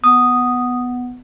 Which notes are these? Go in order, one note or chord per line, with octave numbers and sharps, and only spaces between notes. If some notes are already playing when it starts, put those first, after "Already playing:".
B3 D#6